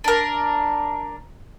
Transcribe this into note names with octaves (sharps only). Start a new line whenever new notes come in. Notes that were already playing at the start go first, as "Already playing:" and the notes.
D4 A#4